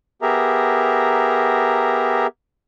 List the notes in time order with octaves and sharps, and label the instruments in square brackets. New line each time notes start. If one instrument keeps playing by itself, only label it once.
[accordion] B3 G4 G#4 A#4 E5 A#5